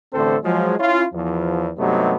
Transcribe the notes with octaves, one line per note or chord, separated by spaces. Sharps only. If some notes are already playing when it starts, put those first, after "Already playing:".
A1 D3 A3 C4 A4 C5
F3 F#3 G#3
C#4 E4 F4
E2 F3
G2 C3 F#3 A3 B3 D#4